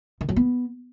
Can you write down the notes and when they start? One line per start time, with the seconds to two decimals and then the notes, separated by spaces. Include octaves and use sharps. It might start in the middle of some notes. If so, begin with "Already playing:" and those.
0.21 D#3
0.29 F#3
0.36 B3